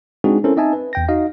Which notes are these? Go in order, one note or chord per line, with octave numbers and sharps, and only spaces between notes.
G#3 C4 D4 D#4 F#4 G#4
C4 C#4 E4 A4 A#4 C5
C4 D#4 D#5 E5 G#5 A5
B4
E2 G5 A#6
D#4 F#4 D#5 F5